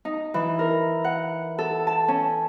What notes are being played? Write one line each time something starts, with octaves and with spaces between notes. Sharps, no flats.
D#4
E3
A#4
F#5
A4
A5
C#4